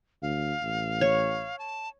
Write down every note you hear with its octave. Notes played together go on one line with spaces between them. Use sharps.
D2 F5
A1
C#5
A5